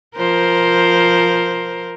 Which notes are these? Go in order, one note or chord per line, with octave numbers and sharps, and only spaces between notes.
F3 A#4 C5